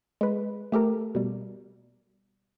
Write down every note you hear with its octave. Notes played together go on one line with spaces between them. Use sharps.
G#3 B4
A3 G4 A4 A#4
B2 G3